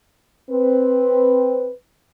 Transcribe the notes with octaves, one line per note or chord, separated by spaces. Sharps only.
C4 B4